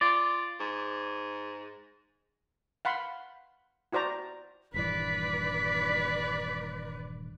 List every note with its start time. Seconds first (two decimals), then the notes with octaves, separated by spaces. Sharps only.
0.01 F4 D5
0.60 G#2
2.85 F5 F#5 B5 C6
3.92 E4 F#4 C5 D5 A#5
4.74 D#1 G2 E3 B4 D5 B6